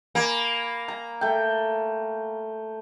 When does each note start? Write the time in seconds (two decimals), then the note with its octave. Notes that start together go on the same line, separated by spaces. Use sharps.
0.15 A#3 G#5 B5
0.88 A#5
1.21 A3 G5